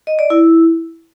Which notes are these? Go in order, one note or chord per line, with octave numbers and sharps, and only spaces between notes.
D#5
D5
E4